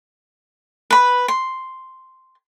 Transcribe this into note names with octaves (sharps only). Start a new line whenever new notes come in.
B4 B5
C6